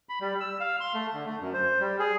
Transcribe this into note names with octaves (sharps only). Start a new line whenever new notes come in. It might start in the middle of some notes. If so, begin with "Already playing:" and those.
B5
G3
E6
F5
C6
A3
D3
A3
F#2
C5
G3
G#4